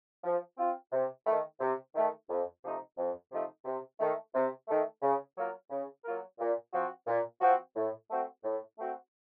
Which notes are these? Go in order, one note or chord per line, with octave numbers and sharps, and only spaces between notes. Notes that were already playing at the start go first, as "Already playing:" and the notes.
F3
C4 F4
C3
D#3 A3
C3
D#3 A3
F2
C3 F3 A3 D#4
F2
C3 F3 A3 D#4
C3
D#3 A3
C3
D#3 A3
C#3
F#3 A#3 F4 A#4
C#3
F#3 A#3 F4 A#4
A#2
F3 C4 F#4
A#2
F3 C4 F#4
A2
A3 C4 F#4
A2
A3 C4 F#4